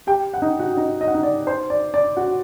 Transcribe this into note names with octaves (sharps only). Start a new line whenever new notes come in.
G4 G5
F#5
D#4 D#5
F#4 F#5
D#4 D#5
D#5
F#5
D#4 D#5
D5
C5
D5
D5
F#4 F#5